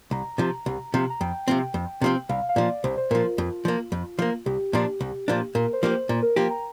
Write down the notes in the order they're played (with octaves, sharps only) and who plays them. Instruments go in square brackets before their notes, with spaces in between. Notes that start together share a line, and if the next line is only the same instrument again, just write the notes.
[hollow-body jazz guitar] C2 [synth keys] A#5
[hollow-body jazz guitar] C3 F3
C2
C3 F3
[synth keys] A#5
[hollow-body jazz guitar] F2 [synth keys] G5
[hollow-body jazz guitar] C3 F3 C4
F2
C3 F3 C4
[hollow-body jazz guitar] C2 [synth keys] F5
[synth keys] F5
[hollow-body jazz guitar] A#2 F3 [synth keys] D5
[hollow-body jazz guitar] C2 [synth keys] C5
[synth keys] C5
[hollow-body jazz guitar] A#2 F3 [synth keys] A#4
[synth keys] F4
[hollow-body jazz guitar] F2
F3 A#3
F2
F3 A#3
[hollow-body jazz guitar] C2 [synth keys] G4
[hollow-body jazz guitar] A#2 F3 D4
C2
A#2 F3 D4
[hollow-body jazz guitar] A#2 [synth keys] A#4
[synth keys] C5
[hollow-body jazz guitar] F3 A#3 G4
[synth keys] C5
[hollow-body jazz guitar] A#2
[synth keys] A#4
[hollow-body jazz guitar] F3 A#3 G4 [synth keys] G5
[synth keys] A#5